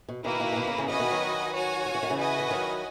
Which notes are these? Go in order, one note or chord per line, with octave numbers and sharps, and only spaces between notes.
B2
B2 D#3 A#3 E4 B4
B2 D#3
E3
B2 D#3
C#3
C#3 E3
C#3 E3 F#4 B4 D#5 G#5
B2 D#3
D#3 F#3
F#4 C#5 G#5
F#3
E3
D#3
C#3 E3
F#4 B4 D#5 G#5
E3
D#3 F#3